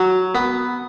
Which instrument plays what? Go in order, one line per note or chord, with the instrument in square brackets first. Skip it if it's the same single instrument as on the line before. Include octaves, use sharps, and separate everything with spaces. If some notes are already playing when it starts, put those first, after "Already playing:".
Already playing: [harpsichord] F#3
B3